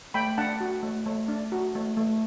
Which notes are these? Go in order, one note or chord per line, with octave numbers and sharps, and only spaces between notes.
A3 G5 B5
D4 F#5 A5
F#4
A3
A3
D4
F#4
A3
A3